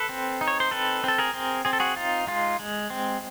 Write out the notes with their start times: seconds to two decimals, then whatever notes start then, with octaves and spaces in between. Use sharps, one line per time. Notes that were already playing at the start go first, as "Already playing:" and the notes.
Already playing: A4 B4
0.09 C4
0.41 D#4
0.48 C#5
0.60 C5
0.71 C4 A4 B4
1.04 C4 A4
1.18 G#4 A#4
1.34 C4
1.65 C4 G#4
1.73 A4
1.80 F#4 G#4
1.96 D#4 F4
2.27 G#3 F4
2.59 G#3
2.90 C4